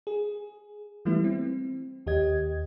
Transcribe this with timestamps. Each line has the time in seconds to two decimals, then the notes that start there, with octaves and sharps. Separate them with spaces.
0.07 G#4
1.05 E3 G3 A3 B3 E4
1.24 C4
2.07 D#2 G4 D#5 G#6